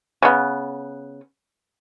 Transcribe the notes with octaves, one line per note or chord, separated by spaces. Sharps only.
C#3 B3